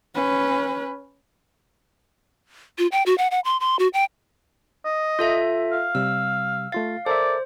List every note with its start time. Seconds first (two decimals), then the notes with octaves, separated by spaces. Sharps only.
0.15 C#4 B4
2.79 F4
2.92 G5
3.06 F#4
3.18 F#5
3.31 F#5
3.45 C6
3.60 C6
3.79 F#4
3.93 G5
4.85 D#5
5.19 F4 A4 E5
5.72 F5
5.95 C3 G3 E6
6.72 A3 F4 F5 A6
7.06 A4 A#4 C5 D5 E5